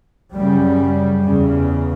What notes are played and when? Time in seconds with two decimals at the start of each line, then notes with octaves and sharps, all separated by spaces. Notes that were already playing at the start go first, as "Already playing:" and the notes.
0.33 F#2 C#3 G3
1.23 E2 C#3